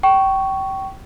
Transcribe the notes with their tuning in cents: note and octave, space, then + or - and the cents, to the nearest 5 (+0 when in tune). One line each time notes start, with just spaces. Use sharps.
G5 -25 C#6 +0